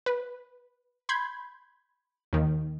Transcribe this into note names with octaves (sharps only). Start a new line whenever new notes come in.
B4
B5 C6 G6 G#6
D#2 D#3